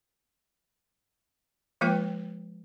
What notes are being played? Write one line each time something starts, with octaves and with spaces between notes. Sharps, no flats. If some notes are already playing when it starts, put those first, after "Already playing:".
F3 G#3 A#3 F4 B4 G5